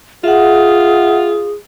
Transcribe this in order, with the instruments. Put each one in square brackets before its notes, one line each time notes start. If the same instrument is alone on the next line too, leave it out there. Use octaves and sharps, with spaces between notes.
[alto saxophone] F4 [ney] G#4 [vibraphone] E5 F#5